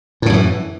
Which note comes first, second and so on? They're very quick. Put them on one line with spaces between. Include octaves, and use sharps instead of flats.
A2 C#3 F#2 E3